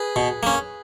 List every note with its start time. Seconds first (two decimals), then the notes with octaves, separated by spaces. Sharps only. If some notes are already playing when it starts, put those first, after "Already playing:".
Already playing: G#4 B4
0.16 B2
0.43 A#3 C#4